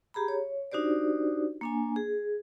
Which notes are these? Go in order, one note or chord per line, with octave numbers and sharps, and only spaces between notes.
G4 G#4 A#5 B5
C#5
D4 D#4 F#4 G4 C5 D5
A#3 D4 G#5
G#4